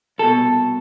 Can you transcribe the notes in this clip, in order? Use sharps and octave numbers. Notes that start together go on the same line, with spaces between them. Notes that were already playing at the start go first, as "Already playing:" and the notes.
C2 B2 A4